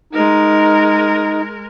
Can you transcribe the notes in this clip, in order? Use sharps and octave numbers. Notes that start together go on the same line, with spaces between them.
G#3 D#4 A#4